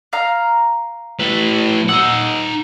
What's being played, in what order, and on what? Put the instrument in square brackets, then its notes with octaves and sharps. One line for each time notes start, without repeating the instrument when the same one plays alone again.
[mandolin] F5 A#5 F6
[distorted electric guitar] A2 B4
[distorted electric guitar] D#4 F#5 [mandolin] E6